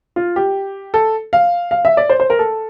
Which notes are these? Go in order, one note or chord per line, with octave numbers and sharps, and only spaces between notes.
F4
G4
A4
F5
F5
E5
D5
C5
C5
A#4
A4